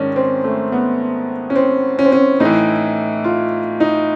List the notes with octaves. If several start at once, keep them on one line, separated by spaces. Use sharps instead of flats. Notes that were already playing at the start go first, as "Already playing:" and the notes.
Already playing: G#2 D#3 C#4 D4
C4
A3
B3
C#4
C4
C#4
C4
C#4
A2 D#4
E3
F4
D#4